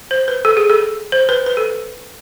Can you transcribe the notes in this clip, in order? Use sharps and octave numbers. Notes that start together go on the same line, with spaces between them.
C5
B4
A4
G#4
A4
C5
B4
B4
A4